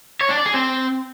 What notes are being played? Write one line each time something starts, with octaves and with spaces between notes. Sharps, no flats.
C#5
D4
D5
G#4
C4